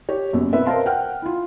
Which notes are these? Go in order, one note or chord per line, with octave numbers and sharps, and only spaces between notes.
G4 C#5
F#1 F#2 B2
B3 C4 B4 E5
A#4 C5 D#5 F5 A5 C6
F#5 G5 F6
E4 F4